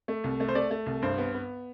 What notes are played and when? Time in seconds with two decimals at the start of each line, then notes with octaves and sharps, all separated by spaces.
0.08 A3
0.24 C2
0.40 A3
0.48 C5
0.55 A3 D5
0.71 A3
0.86 C2
1.02 G2 C5
1.18 B3
1.34 B3